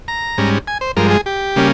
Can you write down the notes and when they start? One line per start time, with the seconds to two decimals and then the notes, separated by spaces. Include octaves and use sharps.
0.08 A#5
0.38 G#2 G3 C#4
0.67 G#5
0.81 C5
0.97 G2 F3 G#3 A#4
1.11 G#4
1.26 G4
1.56 C#3 G3 A#3 C#4